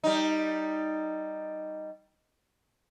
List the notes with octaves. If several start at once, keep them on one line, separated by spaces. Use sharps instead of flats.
G3 D#4